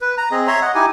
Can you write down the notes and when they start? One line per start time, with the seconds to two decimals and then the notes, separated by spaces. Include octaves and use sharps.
0.01 B4
0.18 A#5
0.31 C4 G#4 D#5
0.47 C#5 E5 A#5 C6
0.62 D#5 F#5
0.75 D#4 E4 G4 G#5